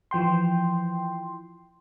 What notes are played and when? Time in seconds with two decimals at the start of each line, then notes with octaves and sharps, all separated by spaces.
0.11 E3 F3 G5 C6